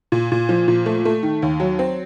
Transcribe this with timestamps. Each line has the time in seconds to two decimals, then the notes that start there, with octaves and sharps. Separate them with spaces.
0.12 A#2
0.32 A#2
0.49 F3
0.68 A#2
0.86 A3
1.05 A3
1.23 D#3
1.42 D#2
1.60 F#3
1.79 C4